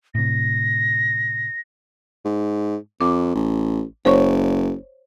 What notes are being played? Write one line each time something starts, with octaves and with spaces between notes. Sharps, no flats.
A2 C3 A#6
G#2
F2 D6
A1
F#1 C5 C#5 C#6